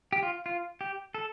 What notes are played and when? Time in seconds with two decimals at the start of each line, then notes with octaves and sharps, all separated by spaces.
0.13 G4
0.23 F4
0.46 F4
0.81 G4
1.15 A4